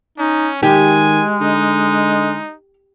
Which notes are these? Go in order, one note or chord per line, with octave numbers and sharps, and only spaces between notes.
C#4 D#4
D#3 G#3 G4 G#5
D3 D#4